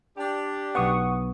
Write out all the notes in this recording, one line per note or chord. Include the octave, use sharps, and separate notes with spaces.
D4 G4
B1 B3 F#5 C#6 D#6